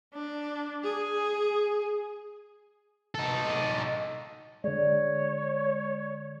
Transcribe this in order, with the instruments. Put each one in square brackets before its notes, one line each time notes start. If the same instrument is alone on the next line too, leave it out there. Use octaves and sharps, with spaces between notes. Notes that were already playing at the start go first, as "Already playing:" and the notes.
[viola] D4
G#4
[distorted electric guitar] D#4 A4
[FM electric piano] D3 G#3 [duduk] C#5 [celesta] D5